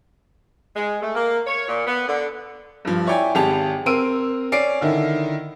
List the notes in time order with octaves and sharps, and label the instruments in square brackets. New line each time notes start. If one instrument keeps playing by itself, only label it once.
[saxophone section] G#3
A3
A#3
C#5
A#2
B3
D3
[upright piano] G2 F3
E4 C#5 D5 G5 G#5
G#1 G4 G#4 G5 A5 F7
C4 A#4 C6 E6 D7 D#7
C#4 D5 C7 D7
D3 D#3 E4